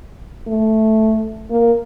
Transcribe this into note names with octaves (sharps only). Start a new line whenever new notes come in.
A3
A#3